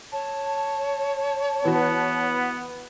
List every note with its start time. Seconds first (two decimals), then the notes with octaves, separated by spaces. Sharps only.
0.12 C#5 A5
1.65 E3 B3 F#4